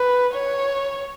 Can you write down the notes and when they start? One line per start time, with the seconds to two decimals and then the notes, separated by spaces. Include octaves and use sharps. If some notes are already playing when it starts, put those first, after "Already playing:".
Already playing: B4
0.33 C#5